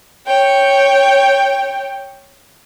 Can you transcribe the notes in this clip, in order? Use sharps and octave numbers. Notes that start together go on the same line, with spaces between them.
C#5 G5